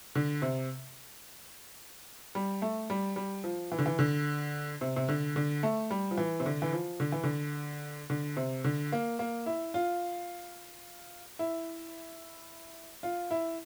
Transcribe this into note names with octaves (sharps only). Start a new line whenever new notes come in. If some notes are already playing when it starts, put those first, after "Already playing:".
D3
C3
G3
A3
G3
G3
F3
E3
D3
E3
D3
C3
C3
D3
D3
A3
G3
F3
E3
C3
D3
E3
F3
D3
E3
D3
D3
C3
D3
A#3
A#3
E4
F4
E4
F4
E4